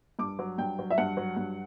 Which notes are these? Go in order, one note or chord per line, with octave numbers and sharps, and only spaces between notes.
G2 D6
F#3
G2 G5
F#3
E5
G2 F#5
F#3
G2